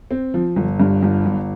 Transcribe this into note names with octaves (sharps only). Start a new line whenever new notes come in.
C4
F3
G1
G2
G1
G1